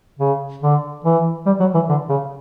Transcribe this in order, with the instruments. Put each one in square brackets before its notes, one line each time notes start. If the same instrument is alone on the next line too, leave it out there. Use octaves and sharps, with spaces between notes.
[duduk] C#3
D3
E3
G3
F#3
E3
D3
C#3